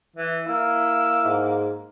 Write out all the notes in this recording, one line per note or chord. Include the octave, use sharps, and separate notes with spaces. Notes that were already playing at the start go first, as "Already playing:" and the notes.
E3
A#3 E4 E6
G#2